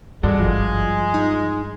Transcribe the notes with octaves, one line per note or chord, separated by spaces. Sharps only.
G2 G3 G#3 F#4 A4 D5
G#1 F3
D#4